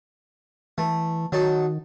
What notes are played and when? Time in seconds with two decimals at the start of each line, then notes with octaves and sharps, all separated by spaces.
0.78 E3 A3
1.32 D#3 F#3 D#4 A5